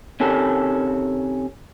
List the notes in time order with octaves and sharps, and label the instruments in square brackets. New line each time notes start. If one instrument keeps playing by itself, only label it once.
[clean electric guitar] C3 D#3 C#4 A4